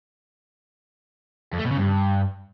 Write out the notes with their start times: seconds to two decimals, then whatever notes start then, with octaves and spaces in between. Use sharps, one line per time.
1.53 F2
1.59 A3
1.65 B2
1.71 C#3
1.77 G2